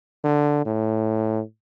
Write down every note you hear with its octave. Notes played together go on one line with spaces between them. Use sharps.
D3
A2